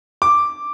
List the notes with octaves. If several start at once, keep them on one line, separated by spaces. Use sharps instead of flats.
D6